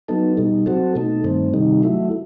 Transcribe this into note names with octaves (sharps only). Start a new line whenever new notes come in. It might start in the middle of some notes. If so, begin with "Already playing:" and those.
F#3 B3 D#4 A4
B2 G3 D#4
F#3 C4 F#4 A4
B2 A3 D#4 A4
G2 D#3 A3 C4
C3 D#3 G3 D#4
F#3 A3 E4